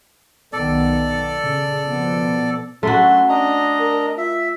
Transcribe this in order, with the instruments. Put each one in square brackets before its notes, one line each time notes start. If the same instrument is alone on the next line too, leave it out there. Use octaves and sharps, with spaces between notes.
[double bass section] B1 D#3 B3 [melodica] A4 D5
[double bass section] C#3
B2 F3 B3
[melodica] F#3 C6 [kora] A3 F#4 [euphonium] C#4
[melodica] D4 D#5 A#5
[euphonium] A#4
[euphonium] F4 [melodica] E5